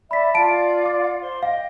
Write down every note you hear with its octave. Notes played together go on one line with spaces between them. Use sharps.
D5 E5 B5 B6
F4 D5 F5 A5 D7
D6
C5 C6
D#5 F5 G5